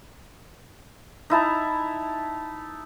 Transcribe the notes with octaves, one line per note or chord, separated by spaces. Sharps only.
D#4 E4 A5 A#5